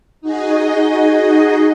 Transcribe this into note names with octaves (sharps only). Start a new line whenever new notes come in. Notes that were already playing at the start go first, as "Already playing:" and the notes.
D#4 F#4 G#4 D#5